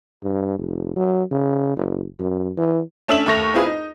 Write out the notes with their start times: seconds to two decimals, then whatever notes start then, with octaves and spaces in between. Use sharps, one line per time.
0.23 G2
0.59 F1
0.96 F#3
1.31 C#3
1.77 F#1
2.19 F#2
2.57 E3
3.08 A3 C#4 D4 E5 E7 F#7
3.26 D#2 A3 C#6 A#6 F7
3.54 C4 E4 F4 G#4 B4
3.66 D#4